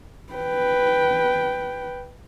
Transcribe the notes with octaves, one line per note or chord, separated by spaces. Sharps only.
B4 G5